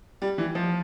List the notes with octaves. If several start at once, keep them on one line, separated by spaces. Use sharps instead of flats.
G3
E3
F3